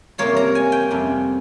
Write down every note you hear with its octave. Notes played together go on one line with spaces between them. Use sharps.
C3 G3 A#3 F4 C#5
A#5
G#5
G5
F2 C3 G3 C#4